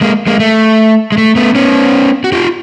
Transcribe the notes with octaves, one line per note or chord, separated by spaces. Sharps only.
G#3 A#3
G#3 A#3
A3
G#3
A3
A3 B3
B3 C#4
F#4
F4 G4